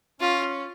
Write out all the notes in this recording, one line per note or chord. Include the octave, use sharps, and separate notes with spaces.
C#4 F4